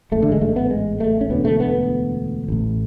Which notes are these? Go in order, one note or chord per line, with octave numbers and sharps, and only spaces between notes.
A1 G#2 A3
D3
G#3
A3
B3
G#3
A3
C#4
E1 D2 D3 B3
A3
B3
A1 A2